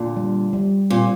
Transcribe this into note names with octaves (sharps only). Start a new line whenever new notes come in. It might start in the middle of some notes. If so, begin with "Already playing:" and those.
Already playing: A#2 D3
G3
G3
A#2 C4